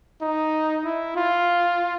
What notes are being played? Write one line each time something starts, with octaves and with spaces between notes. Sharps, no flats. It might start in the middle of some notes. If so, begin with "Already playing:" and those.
D#4
E4
F4